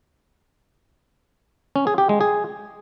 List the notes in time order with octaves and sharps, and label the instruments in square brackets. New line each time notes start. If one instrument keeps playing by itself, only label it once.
[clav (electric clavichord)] C#4
G#4
G4
G#3
G#4